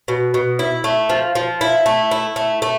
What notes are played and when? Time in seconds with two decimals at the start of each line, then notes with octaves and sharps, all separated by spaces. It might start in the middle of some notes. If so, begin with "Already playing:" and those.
0.08 B2
0.34 B2
0.59 E4
0.84 A3
1.10 F3
1.35 F3
1.61 E4
1.86 A3
2.11 E4
2.36 A3
2.62 A3